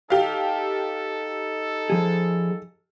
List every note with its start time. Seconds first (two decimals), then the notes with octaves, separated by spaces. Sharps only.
0.10 D#4 G4 A4 F5
1.90 F3 G#4